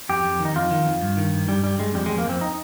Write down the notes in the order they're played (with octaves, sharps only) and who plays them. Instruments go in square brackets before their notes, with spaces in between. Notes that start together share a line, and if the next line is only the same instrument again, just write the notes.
[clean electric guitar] F2 G4
F2
D#3
D#4
F2 F4
D#3
F2
G2
D#3
G2
G2 G3
G2 G3
G2 G#3
F2 G3
G#3
F2
A#3
F2 C4
D#4